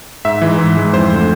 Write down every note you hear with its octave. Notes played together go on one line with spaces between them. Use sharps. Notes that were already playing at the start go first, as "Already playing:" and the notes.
G#2 E5
E3 G#3
G#2
E3 G#3
F2 C5
D3 A3